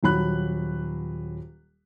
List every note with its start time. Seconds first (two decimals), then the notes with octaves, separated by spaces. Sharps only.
0.03 D#1 F#3 B5 F#6